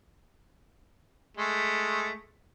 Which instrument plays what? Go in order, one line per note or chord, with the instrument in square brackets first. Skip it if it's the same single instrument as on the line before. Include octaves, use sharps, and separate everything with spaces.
[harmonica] G#3 A3